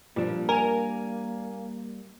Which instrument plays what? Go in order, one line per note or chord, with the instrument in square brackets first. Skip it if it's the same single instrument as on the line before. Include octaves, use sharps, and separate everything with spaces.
[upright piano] A#2 F3 [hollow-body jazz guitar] G3 D4 [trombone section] A#3
[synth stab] A#4 [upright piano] G#5